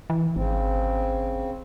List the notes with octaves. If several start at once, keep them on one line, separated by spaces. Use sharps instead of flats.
E3
G#1 C#3 C4